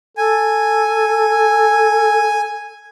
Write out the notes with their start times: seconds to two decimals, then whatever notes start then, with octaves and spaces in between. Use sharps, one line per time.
0.17 A4 G#5